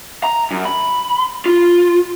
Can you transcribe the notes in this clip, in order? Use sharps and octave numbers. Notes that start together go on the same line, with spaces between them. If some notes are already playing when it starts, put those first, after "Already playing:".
A#5
F#2
B5
F4